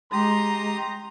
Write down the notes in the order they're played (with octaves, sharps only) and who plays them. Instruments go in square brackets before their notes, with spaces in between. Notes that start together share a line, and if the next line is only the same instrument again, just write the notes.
[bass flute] G#3 [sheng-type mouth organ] G4 D#6 [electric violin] A#5 [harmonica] C6